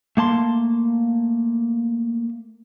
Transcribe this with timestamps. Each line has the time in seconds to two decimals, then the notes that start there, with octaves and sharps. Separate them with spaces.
0.17 A3 A#3 A5 C6